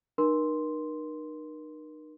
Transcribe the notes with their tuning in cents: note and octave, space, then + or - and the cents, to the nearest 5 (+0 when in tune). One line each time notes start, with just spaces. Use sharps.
D#4 -35 A#4 +35 C6 +0